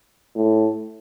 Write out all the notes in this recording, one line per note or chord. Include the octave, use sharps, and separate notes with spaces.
A2